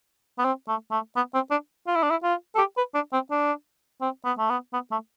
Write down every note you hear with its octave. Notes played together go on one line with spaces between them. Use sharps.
B3
C4
A3
A3
B3
C4
D4
F4
E4
D4
E4
F4
A4
G4
B4
D4
C4
D4
C4
B3
A3
B3
B3
A3